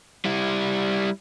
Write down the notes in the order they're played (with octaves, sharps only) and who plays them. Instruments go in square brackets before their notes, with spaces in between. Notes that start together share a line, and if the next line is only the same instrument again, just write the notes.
[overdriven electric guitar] G3 E4